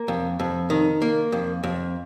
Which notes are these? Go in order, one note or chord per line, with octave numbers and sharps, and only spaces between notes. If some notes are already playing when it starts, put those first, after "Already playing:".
Already playing: A#3
F2
F2
D#3
A#3
F2
F2